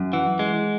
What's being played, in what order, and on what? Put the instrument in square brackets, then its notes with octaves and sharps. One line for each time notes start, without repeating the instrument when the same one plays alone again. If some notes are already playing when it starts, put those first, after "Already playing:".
Already playing: [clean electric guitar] F#2
[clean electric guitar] E3 [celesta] F#5
[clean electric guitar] G#3